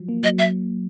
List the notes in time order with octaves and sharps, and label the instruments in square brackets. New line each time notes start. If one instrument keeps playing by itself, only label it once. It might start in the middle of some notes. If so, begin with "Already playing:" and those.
Already playing: [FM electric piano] F3 F#3
A#3
[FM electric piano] F#3 [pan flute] D#5
[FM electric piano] F#3 [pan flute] E5